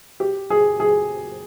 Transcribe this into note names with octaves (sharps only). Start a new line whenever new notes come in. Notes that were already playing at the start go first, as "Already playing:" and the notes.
G4
G#4
G#4